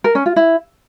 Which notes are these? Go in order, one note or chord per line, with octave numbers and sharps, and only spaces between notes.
A#4
C#4
F4
E4